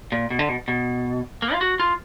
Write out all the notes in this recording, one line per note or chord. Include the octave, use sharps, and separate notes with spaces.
A#2
B2
D3
B2
B2
A#3
F4
F#4
F4